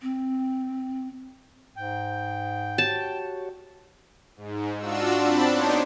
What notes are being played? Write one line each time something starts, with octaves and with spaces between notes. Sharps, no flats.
C4
G#2 G5
F#4 G4 C#5 A5
G#2
D4 F4 F#4 E6
C4 D4 A5 B5
B3 D4 D#4 C5 C#5